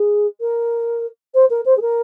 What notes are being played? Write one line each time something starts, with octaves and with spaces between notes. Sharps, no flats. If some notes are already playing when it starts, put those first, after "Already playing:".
Already playing: G#4
A#4
C5
A#4
C5
G#4
A#4